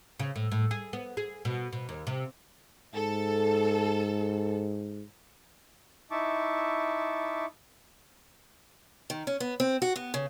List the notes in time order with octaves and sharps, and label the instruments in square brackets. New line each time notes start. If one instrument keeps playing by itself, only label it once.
[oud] C#3
A2
A2
G#4
B3
G#4
B2
B2
D#2
C3
[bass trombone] G#2 [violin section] A4
[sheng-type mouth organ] D#4 E4 E5 A5 C#6 D6
[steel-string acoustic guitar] D#3
C#4
B3
C4
F#4
B3
C#3